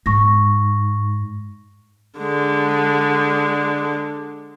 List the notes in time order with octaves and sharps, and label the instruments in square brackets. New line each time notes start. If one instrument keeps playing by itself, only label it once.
[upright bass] G#2 [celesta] C#6 A#6
[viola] D3 G#3